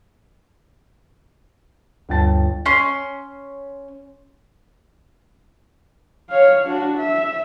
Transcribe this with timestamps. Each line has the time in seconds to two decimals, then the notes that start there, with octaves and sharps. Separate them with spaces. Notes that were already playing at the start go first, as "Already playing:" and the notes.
2.09 G1 D2 G5 A5 A6
2.66 C#4 C6
6.29 C#5 F5
6.65 D4 F#4
6.98 E5